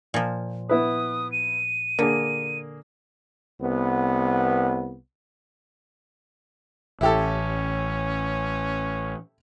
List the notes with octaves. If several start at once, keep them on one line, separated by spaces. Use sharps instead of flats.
A#2 F3
B3 E4 B4 D#6
D#7
D3 A#3 G#4
C2 B3
A1 C#4 E4 G4 A4